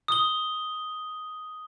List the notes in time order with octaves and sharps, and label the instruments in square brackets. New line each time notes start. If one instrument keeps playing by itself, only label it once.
[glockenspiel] D#6 G7